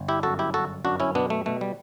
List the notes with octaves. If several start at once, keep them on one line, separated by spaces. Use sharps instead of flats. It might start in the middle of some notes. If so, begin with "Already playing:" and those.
Already playing: G1
E4 G4
F#2 F#4 A4
E4 G4
G1 F#4 A4
F#2 D4 F#4
C#4 E4
B2 B3 D4
A3
B2 A3
G3